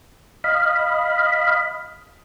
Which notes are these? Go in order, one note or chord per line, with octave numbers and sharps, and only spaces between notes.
D#5 F5 B5